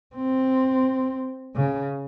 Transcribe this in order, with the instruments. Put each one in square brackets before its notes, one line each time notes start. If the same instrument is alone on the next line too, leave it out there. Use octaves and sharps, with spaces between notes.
[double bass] C4
C#3